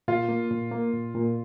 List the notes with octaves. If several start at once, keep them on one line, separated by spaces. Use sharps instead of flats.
A#2 F4
A#3
A#2
A#3
A#2
A#2